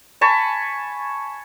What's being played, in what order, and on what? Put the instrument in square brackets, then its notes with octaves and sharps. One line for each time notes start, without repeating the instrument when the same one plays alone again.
[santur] G#5 A5 B5 C#6